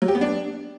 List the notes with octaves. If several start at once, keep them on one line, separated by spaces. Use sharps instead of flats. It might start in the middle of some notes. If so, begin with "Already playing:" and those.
F#3
G4
B3
D4